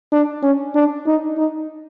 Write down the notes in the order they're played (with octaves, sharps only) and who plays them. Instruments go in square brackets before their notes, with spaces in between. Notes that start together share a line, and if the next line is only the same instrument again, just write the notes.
[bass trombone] D4
C#4
D4
D#4
D#4